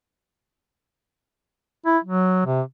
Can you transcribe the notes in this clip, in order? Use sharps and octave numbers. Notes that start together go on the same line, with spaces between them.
E4
F#3
C3